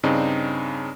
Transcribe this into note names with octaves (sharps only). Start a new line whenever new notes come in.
G2 C#3 C4 D4 D#4